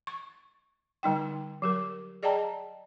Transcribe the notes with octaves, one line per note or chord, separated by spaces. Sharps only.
C#6
D3 G3 D#4 G5
F#3 G4 A#4
G#4 D5 D#5 G5 A5 A#5